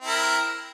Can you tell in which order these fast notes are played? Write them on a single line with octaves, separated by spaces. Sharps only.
C4 E4 A#4